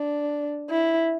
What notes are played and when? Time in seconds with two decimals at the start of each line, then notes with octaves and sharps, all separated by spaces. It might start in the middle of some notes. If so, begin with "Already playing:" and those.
Already playing: D4
0.70 E4